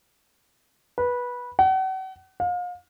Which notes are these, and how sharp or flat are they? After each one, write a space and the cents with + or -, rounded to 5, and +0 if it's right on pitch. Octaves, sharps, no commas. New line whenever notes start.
B4 -15
F#5 +40
F5 +35